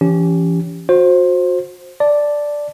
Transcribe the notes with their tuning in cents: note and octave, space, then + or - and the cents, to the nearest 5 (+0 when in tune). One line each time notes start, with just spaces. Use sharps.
E3 +30 C#4 +20 G4 +0
F#4 -30 C5 +15
D5 +0 A5 +0